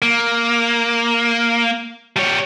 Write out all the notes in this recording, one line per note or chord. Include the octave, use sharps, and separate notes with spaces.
A#3
G3 C#5